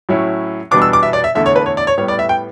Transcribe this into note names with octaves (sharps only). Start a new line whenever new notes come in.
A2 F#3 C#4 E4
E2 B2 G3 B3 D4 D6
E6
D6
E5
D5
E5
E2 D3 A3 E4 E5
C#5
B4
C#5
D5
C#5
A2 G3 B3 C#5
D5
E5
G5